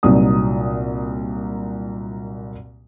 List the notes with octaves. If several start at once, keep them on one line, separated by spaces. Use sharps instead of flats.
C2 A#2 F#3 D#4 D#6